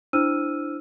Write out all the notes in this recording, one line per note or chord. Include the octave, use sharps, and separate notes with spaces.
D4 E4 C5 E6 F6 D#7